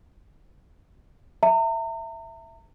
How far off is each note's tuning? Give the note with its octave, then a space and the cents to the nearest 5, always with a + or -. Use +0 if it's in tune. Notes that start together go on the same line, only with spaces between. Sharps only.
E5 +5 A#5 -40